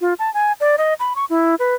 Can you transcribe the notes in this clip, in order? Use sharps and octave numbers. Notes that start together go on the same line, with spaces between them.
F4
A5
G#5
D5
D#5
B5
C#6
E4
B4